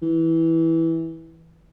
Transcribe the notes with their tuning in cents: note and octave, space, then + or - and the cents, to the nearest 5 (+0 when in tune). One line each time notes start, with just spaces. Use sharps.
E3 -10